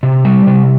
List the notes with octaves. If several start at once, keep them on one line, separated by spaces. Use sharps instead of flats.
C3
G3
C3